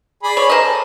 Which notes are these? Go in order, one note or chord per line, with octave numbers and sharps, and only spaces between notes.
G#4 D5 B5
C#5
A#4 C5 D#5
A4